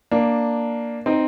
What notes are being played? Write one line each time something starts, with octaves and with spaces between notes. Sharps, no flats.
A#3 D4
C4 D#4